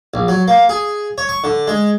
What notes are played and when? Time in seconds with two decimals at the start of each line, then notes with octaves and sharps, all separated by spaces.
0.14 A#1
0.28 F#3
0.48 A#3
0.69 G#4
1.18 C#5
1.29 C#6
1.44 D3
1.67 G#3